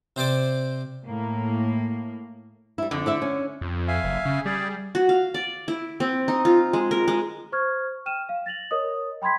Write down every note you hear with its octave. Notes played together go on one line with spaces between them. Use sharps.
C3 C5 D5 D6
A2 A#3
G3 E4
F2 D3
E4 D5 E5
C#4
F2
E5 F5 G#5
F#1
C#3
G3 G#4 D5
F#4
F5
D5
E4
C4
D#4
F4
G#3
A#4
G#3
C5 C#6 F6 G#6
G5 F6 D#7 E7
F5
A6 A#6 F7 F#7
A#4 C#5 D#5 D#6
G5 B5 C6 G#6 B6